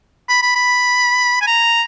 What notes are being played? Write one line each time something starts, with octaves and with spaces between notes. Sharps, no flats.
B5
B5
B5
G#5
A#5